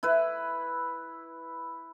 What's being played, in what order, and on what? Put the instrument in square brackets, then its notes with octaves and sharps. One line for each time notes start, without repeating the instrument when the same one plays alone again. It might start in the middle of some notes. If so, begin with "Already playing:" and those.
[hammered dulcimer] E4 B4